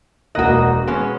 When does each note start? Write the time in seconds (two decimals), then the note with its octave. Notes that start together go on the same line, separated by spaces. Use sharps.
0.35 E1 A#3 F#4 D#5 F#6
0.87 G#3 B3 C#4